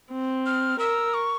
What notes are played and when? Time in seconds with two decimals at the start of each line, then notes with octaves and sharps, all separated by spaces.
0.12 C4
0.46 F6
0.79 A#4 E6
1.14 C#6